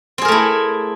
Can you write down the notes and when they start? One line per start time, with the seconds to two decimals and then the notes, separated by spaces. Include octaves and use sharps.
0.18 C4
0.22 G#4
0.25 A#4
0.28 A3
0.32 E4